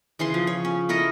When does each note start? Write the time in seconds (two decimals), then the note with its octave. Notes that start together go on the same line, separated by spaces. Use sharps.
0.19 C#3 E3 G#4 C6
0.34 F3
0.47 C#5
0.65 C#4
0.89 E4 A4 A#4 D#5